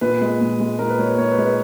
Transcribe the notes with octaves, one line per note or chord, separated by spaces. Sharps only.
A#2 B4
G#3
A#2
G#3
A#2 A#4
B4
G#3 C#5
B4
A#2 C#5
B4
G#3
B4